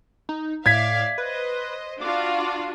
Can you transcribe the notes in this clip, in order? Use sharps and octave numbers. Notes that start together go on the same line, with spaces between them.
D#4
A2 D5 E5 F5 G#6 B6
B4 C5 D#5
D4 F4 F#4 F5 D6